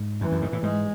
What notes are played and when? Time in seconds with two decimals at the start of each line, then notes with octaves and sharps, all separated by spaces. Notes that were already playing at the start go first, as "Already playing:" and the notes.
Already playing: G#2
0.21 F#2 E3
0.32 F#2
0.42 G#2
0.53 A2
0.63 G#2 G#3